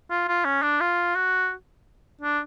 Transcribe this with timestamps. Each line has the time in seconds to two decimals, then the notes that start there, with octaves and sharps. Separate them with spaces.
0.10 F4
0.28 F4
0.45 C#4
0.62 D4
0.80 F4
1.15 F#4
2.21 D4